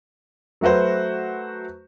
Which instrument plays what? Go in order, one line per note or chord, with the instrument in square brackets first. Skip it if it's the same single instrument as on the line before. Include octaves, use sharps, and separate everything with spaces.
[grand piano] F#3 A3 F#4 B4 C5